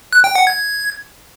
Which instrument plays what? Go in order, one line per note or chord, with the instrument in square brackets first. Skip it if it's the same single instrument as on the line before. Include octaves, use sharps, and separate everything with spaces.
[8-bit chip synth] F#6
G5
F#5
G#6